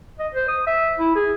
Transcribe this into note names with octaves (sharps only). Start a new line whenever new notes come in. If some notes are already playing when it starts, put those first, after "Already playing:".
D#5
C5
D#6
E5
E4
G#4